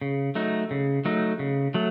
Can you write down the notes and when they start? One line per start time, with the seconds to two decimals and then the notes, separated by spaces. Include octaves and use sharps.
0.01 C#3
0.35 F#3 A3 D#4
0.71 C#3
1.05 F#3 A3 D#4
1.39 C#3
1.74 F#3 A3